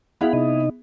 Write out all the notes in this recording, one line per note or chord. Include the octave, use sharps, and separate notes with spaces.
B3 E4 G#4 F5 F#5 B5
C3 D#4 D#5